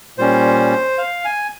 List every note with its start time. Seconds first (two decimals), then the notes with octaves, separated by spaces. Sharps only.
0.18 A#2 G3 C#4 C5
0.98 F5
1.25 G#5